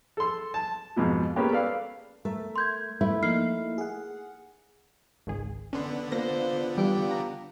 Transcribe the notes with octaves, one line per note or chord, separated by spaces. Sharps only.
A4 C6
A5
F2 G#2 B2 F3
G#3 A#3 B3 C#4 G4
A4 B4 D5 F5
A3 A#4 E5
C6 G6 G#6
A3 E4
F3 A#3 D#4 F6 C7
G#4 F#5
G#1 C#2 G#4
D3 B3 C#4 D4 C6
A#3 F4 C5 A#6
E3 G3 G4
A#5